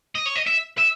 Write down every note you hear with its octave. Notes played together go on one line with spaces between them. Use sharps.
D#5
C#5
D#5
E5
E5